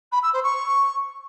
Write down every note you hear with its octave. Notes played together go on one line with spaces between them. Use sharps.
B5
E6
C5
C#6